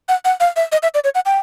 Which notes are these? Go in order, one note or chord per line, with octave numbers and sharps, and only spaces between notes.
F#5
F#5
F5
E5
D#5
E5
D5
C#5
F#5
G5